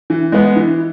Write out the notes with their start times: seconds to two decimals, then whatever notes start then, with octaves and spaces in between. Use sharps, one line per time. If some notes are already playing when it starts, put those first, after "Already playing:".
0.10 E3
0.32 G#3 B3
0.56 E3